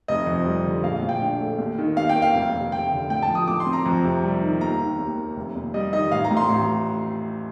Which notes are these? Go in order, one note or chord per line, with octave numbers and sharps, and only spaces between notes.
F1 D#5
F2
G3
D3
A#1 F5
F5
A2
G5
D4
A3
D#2
D#3
D#2 F5
G5
A#3
F5
F1
D#2
F1 G5
D3
A2 G5
A5
F3
D#6
A2 D6
C6
C4
A#5
F2
C3
G3
D#3
D#2 A#5
D#3
D#2
A#3
F1
D#2
G3 D#5
D#3 D#5
A1 F5
A#5
A2
C6
A1